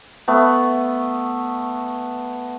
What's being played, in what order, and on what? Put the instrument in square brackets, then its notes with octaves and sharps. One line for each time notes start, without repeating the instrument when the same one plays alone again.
[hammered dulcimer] A3 B3